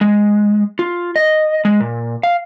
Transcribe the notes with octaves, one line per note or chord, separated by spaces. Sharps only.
G#3
F4
D#5
G#3
A#2
F5